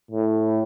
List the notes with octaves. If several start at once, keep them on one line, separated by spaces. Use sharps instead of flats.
A2